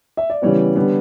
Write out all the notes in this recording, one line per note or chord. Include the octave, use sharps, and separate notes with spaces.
E5
D5
C#3 E3 G3 B3 C#5
D3 G3 B3